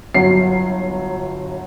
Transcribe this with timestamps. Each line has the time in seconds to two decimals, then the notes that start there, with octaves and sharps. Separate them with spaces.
0.14 G1 F#3 C7